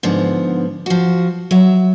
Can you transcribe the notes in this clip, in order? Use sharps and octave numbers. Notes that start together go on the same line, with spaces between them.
G#2 D3 F3 B3
F3 F#4
F#3 E5